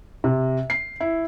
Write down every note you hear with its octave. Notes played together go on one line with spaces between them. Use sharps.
C3
C7
E4